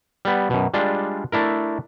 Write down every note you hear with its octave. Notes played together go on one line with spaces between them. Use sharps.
G3 B3
F#2 B2
G3 G#3 D4 F4
A3 D4 E4 A#4